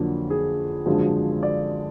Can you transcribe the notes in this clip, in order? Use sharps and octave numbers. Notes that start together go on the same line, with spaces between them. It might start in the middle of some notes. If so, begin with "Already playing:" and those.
Already playing: F2 D3 F#3 A#3
G#4
G#1 F#2 D3 F3 G#3
D5